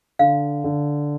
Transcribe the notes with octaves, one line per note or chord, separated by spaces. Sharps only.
D3 F5
D3